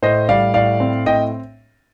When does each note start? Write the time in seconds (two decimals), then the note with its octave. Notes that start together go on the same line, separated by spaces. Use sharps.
0.02 A2 C5 D#5
0.29 G3 D5 F5
0.54 A2 D5 F5
0.80 C4
1.06 A2 D#5 G5